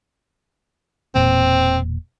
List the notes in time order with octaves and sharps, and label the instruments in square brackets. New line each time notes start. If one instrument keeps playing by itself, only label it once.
[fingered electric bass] E1 A#2 [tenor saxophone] C4